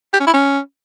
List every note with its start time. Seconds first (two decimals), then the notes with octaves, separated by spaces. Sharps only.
0.13 G4
0.20 C#4
0.27 E4
0.33 C#4